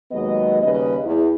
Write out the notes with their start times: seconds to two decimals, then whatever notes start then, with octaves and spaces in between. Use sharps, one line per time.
0.11 D#2 F#3 G#3 B3 D#5
0.62 D#2 C#3 G3 B4 D#5
1.05 E2